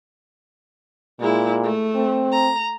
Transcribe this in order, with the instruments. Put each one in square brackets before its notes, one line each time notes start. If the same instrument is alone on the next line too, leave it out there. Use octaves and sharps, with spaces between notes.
[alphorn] A#2 [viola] G#3 E4
[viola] A3
[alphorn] C4
[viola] A#5